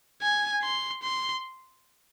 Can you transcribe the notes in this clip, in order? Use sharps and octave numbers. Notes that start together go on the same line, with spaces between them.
G#5
C6
C6